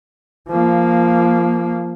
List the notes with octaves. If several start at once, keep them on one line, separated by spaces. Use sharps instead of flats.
F3 A#3